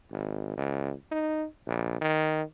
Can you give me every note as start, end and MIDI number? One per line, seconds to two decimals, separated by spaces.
0.11 0.54 32
0.57 0.94 37
1.11 1.46 63
1.67 1.99 34
2.01 2.43 51